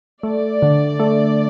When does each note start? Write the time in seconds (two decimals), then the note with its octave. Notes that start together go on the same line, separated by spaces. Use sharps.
0.23 A3 D5
0.62 D3
1.00 A3